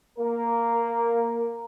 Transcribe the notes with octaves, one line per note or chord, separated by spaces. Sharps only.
A#3 A#4